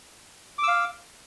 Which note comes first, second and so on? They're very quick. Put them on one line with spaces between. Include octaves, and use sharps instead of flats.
D6 E6 F5